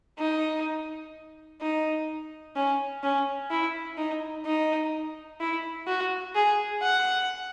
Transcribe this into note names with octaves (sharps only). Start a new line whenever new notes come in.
D#4
D#4
C#4
C#4
E4
D#4
D#4
E4
F#4
G#4
F#5